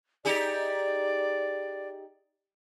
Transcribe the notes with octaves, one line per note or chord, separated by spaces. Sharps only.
D#4 G4 G#4 D5